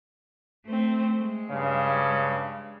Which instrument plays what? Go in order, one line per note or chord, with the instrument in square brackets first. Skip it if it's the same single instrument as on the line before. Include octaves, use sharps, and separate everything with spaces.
[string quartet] A3 C4
G#3
[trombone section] G2 C#3